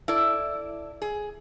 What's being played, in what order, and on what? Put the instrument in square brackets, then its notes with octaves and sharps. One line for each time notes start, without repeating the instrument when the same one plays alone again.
[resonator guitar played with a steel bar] E4 A4 D5
G#4